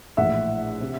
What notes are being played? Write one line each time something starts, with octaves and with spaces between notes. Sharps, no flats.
A#1 A2 E3 E5 F#5
C3